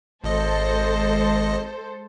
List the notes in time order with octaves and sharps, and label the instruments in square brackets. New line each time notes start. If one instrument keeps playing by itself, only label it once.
[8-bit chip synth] G#1 D#5 [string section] G#3 A4 C5